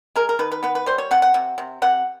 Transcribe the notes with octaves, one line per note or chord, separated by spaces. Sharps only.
G#3 A#4
A#4
D#3 B4
B4
B3 B4
B4
G3 C5
C#5
C3 F#5
F#5
C3
C3
C3 F#5